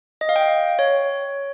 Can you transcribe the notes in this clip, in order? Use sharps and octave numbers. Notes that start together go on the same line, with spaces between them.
D#5
F5
G5
C#5